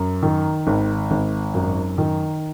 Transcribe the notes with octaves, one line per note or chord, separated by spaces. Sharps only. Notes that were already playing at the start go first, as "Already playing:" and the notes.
Already playing: F#2
D#3
G#1
G#1
F#2
D#3